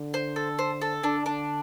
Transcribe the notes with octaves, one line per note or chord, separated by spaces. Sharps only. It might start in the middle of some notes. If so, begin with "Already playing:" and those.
Already playing: D3
C5
A4
C5
A4
D3 D4
D4